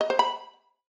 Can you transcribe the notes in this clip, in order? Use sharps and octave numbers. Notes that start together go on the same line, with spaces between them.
D#5
C5
B5